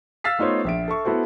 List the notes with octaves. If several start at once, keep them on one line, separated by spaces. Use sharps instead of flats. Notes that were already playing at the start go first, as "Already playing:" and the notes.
F5 E6 F6 A6 B6 C7
A3 B3 D#4 F4 C5 C#5
A#1 E5 D7
A4 E5 C#6
B3 E4 F#4 A4 C5